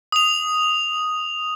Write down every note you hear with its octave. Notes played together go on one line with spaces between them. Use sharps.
D#6 F7